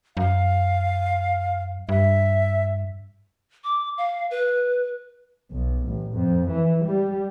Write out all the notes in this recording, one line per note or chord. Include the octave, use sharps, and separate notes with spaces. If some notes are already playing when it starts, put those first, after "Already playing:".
F#2 F5
G2 E5
D6
F5
B4
B1
A1
F2
E3
G3